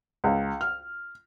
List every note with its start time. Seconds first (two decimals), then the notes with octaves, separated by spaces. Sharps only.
0.24 C#2
0.61 F6